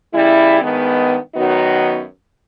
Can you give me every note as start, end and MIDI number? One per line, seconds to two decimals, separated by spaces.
0.14 0.61 40
0.14 0.61 49
0.14 0.61 55
0.14 0.61 64
0.61 1.17 43
0.61 1.17 51
0.61 1.17 56
0.61 1.17 59
1.35 2.03 42
1.35 2.03 51
1.35 2.03 54
1.35 2.03 59
1.35 2.03 63
1.35 2.03 66